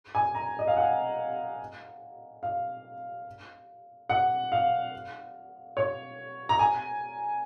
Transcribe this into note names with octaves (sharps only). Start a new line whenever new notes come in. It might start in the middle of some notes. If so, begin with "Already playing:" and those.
G#5
A#5
D#5
F5
F#5
F5
F#5
F5
C#5
A#5
G#5